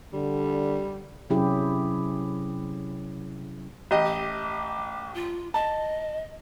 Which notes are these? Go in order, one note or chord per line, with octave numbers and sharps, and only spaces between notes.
D3 G3
C3 F#3 C#4 E4 G4 G#4
A1 G4 D#5
D6
F4
D#5 A5